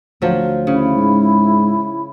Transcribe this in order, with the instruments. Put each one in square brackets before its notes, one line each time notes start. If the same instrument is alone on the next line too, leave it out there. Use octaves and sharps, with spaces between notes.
[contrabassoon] D2 [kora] F3 F#3
[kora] C#3 [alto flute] E4
[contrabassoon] G#2